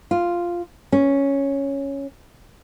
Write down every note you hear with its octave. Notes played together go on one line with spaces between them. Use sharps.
F4
C#4